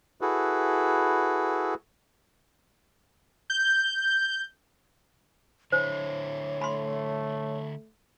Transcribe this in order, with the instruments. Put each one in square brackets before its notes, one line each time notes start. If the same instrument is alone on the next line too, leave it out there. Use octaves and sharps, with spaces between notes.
[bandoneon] E4 F#4 G#4 A4 B4
[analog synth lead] G6
[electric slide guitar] D3 E4 [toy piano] C5 [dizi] C#5
[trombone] A3 [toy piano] B5 C6